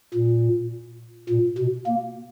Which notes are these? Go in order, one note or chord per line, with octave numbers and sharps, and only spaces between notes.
A#2
A#2
B2
A#3